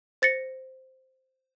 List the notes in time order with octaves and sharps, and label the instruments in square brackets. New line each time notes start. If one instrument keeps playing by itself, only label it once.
[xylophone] C5 A6 A#6 C#7